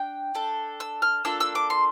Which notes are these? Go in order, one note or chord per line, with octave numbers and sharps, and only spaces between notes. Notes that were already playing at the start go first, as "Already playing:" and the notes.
Already playing: D4 G5
D4 A4
E6
F6
A#3 D4 F4 A4 E6
E6
D6
C6